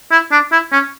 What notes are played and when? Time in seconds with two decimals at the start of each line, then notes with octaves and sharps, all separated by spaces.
0.12 E4
0.32 D4
0.52 E4
0.72 C#4